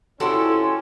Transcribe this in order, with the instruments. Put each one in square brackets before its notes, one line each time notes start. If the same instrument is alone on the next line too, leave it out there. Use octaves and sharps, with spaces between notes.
[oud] F2 E4 [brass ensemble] C#4 [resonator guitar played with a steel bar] F#4 G4 A4 [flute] C6